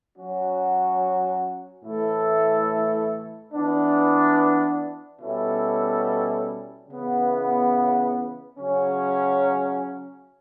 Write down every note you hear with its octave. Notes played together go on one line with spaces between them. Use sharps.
F#3 C#4 F#4
A2 E3 A3 E4 A4
E3 B3 D4
B2 G3 C#4 E4 A4
C#3 E3 B3
C#3 F#3 C#4